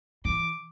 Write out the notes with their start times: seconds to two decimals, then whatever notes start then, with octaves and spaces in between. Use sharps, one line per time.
0.25 E3 D6